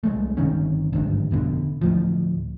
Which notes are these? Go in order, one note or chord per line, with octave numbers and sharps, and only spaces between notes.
C2 G#3 A3
G1 C3 D#3 C#4
G#1 D2 G2
F1 B2 D3
D2 A2 F3